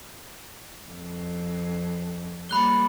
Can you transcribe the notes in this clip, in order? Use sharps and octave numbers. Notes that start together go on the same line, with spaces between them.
F2
G3 A#3 B5 F#6 G7